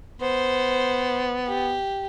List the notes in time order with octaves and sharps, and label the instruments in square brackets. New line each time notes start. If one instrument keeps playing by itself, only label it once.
[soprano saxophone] B3 [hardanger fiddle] C5
[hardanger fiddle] G4